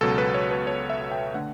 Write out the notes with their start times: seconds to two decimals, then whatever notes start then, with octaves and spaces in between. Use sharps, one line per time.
0.01 C#2 B2 F#3 A4
0.18 B4
0.34 C#5
0.51 B4
0.67 C#5
0.90 E5
1.11 G5
1.34 D3 A3 F#5